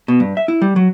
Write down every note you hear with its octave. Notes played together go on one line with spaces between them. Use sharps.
B2
G2
E5
E4
G3
F#3